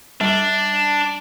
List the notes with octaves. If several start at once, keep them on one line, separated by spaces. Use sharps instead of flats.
G3 D4